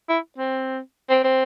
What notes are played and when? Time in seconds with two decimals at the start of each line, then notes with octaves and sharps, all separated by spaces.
0.09 E4
0.38 C4
1.10 C4
1.24 C4